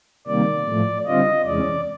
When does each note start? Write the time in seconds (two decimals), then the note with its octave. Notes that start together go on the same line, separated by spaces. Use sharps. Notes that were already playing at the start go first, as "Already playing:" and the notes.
0.27 C3 D#3 G3 A#3 D5
0.67 A2 F3 A3
1.06 D3 G3 C4 F4 D#5
1.46 E2 C3 E3 G#3 C#4 D5